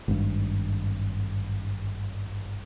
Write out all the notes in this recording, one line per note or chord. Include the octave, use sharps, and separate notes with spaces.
G#1 G2